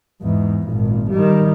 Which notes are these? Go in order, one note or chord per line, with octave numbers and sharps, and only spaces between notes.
E2 G#2
G#1 A#2
D#3 G3